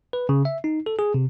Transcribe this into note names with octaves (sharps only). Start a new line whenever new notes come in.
B4
C#3
E5
D#4
A4
G#4
C3